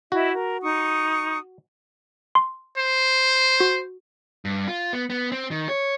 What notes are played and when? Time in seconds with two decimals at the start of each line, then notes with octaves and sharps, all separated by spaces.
0.12 E4 F#4 D#5 E5
0.33 A#4
0.62 D#4 C#6 D#6
2.35 C6
2.77 C5
3.60 F#4
4.45 G2
4.68 F4
4.93 B3
5.10 B3
5.32 C4
5.51 D#3
5.69 C#5